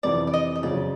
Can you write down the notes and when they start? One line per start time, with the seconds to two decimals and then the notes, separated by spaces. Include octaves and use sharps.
0.03 F2 C3 E3 D5
0.27 D5
0.33 D#5
0.55 D#5
0.63 F#2 C#3 F3 D5